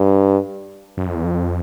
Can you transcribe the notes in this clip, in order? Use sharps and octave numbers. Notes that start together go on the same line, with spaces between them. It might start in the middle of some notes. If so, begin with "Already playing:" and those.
Already playing: G2
F#2
F2
E2
F2